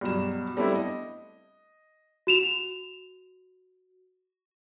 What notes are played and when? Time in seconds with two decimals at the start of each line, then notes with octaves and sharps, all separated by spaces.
0.01 G2 B2 F#3 E7
0.57 G3 A3 B3 C4 D4 E4
0.75 D#5
2.27 F#4 E7 F7